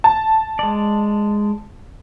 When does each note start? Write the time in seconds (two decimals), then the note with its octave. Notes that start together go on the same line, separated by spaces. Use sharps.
0.04 A5
0.59 G#3 D5